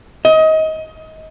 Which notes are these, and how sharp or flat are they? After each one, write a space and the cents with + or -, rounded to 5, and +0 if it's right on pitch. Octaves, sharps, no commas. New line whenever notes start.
D#5 +25